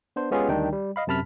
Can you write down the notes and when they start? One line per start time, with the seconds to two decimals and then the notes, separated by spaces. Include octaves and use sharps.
0.16 B3 D4 C5
0.31 G#3 B3 C#4 F4 G4 G#4
0.49 D2 D#3 G3 D4 D#4 G5
0.72 G3
0.96 D#5 F5 B5
1.07 F#2 C3 A5 B5 F6 B6